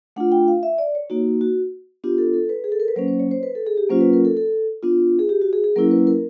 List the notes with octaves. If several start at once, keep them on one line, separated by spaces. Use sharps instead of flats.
A3 D4 F4 F#5
G5
F5
E5
D5
C#5
A#3 D#4 F#4
F#4
B3 D4 F4 G4
A4
A4
B4
G#4
A4
A#4
B4
F#3 A#3 C#4 C5
C5
C#5
C5
B4
A4
G#4
G4
F#3 A#3 C#4 F4 C5
B4
A#4
A4
A4
B3 D4 F4
G#4
G4
F#4
G#4
G#4
F#3 A#3 C#4 E4 A#4
B4
A#4